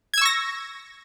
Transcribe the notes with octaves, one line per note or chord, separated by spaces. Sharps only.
C#6 E6 G#6 A#6